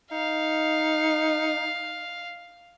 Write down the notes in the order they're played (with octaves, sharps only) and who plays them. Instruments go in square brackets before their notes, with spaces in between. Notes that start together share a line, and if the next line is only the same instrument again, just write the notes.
[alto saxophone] D#4 [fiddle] F5